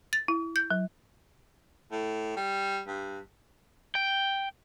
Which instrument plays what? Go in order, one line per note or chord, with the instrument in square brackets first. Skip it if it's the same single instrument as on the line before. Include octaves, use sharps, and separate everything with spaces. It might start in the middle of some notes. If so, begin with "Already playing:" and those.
[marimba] A6
E4
G6
F#3
[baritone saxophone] A2
G3
G2
[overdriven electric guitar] G5